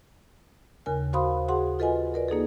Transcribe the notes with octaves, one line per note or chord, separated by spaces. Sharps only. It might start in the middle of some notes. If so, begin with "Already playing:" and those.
D#2 C#3 A#4 G#5
F#4 C5 F5 B5 C6 D#6
F#4 G#4 F#5 C6
F4 A4 B4 D#5 F#5 G#5
A#4 B4 D5
A#3 D#4 G#4 A4